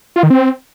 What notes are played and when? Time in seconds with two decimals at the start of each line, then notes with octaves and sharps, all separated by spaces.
0.16 F4
0.23 D#3
0.30 C4